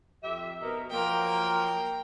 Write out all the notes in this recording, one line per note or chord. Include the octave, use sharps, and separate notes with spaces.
F2 G4 E5
B2 D#4 A#4
F3 F#3 A#3 A#4 G5